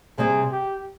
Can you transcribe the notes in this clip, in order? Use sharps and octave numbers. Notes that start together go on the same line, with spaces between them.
C3 G3 C4 G#4
G4